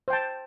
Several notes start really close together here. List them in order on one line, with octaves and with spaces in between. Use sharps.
C5 G5 A5